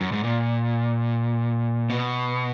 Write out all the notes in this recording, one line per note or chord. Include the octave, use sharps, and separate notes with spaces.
F#2
G#2
A#2
B2